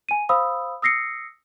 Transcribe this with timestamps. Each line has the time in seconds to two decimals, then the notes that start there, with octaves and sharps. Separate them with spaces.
0.09 G#5 D#7
0.29 C5 F5 B5 D#6 E6
0.82 D#6 E6 A#6 C7 C#7